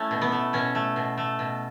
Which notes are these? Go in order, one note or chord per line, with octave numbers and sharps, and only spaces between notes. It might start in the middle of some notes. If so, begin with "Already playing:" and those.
Already playing: A3 C#4 E4
B2
B3
A3
B2 C#4
A3
B2
A3
B2